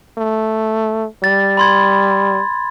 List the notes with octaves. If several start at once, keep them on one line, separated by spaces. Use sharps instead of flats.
A3
G3 A6
B5 C6 G#6